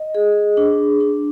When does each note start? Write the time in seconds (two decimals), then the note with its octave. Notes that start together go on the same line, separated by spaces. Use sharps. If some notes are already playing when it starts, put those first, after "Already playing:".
Already playing: D#5
0.15 G#4
0.57 D4
1.01 D4